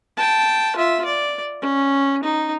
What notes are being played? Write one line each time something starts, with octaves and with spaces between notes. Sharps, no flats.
G5 A5
F4 E5
D5
C#4
D#4